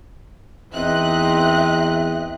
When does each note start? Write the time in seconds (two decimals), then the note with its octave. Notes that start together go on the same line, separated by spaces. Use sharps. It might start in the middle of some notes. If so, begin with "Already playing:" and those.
0.73 E2 C4 D#4 D#5 E5 F#6